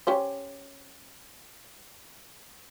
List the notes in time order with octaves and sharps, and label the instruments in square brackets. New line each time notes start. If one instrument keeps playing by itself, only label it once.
[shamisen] C#4 G4 C5